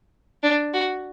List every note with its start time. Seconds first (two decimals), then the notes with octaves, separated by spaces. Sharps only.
0.43 D4
0.74 F#4